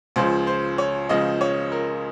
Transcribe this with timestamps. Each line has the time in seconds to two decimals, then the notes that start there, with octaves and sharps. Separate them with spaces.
0.16 C#2 C#3 F3 C5
0.47 C5
0.78 C#5
1.09 C#2 C#3 F3 D#5
1.41 C#5
1.72 A#4